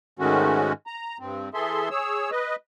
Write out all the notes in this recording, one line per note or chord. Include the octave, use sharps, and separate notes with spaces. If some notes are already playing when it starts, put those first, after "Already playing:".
G#2 D#3 G#3 A3 C#4 F#4
A#5
G2 C4
E3 G#4 A4 E5 C6
G#4 C#5 E6
B4 D#5